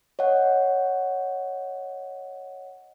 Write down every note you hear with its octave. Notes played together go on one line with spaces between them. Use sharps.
C#5 D#5 F#5